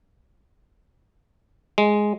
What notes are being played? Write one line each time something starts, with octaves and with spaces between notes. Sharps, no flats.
G#3